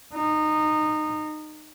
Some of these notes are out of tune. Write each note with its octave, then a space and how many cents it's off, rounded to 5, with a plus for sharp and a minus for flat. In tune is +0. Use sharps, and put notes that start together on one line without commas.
D#4 -20